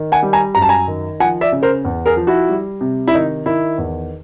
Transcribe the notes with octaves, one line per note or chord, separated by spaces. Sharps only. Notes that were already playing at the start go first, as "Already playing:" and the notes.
Already playing: D#3
F#5 G#5
G3
G#5 A#5
F#2 A#5
A5
G#5 A#5
D#3
F3 F#5 G#5
D5 E5
C#3
A#4 C5
E2
G#4 A#4
F3
E4 F#4
G3
C3
E4
D#3 D#4
D#3 E4
E2